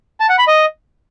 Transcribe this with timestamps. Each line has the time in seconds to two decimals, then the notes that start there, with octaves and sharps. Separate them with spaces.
0.20 A5
0.29 F#5
0.38 B5
0.47 D#5